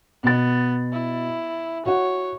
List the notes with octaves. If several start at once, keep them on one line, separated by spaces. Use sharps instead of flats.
B2 B3 A6
E4
F#4 C#5 F#5